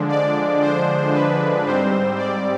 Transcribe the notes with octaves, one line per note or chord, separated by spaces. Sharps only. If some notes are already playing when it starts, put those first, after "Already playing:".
Already playing: D3 F3 G#3 D4
D5
C5
B4
G#2 G3 C4 C5
D5